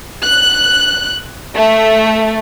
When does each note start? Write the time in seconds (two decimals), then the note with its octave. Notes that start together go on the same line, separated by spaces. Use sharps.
0.22 F#6
1.55 A3